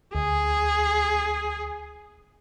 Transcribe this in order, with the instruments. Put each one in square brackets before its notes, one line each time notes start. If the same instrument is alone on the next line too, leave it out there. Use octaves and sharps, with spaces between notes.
[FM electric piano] D2 [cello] G#4